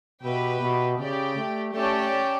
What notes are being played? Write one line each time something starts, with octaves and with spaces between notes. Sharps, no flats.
B2 G4 B4 E5 G5
B2
C#3 G4 D5 G5
A3
A3 C#4 G4 D5 A5